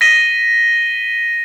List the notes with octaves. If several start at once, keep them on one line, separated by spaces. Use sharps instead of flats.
A#6 B6 D#7 G7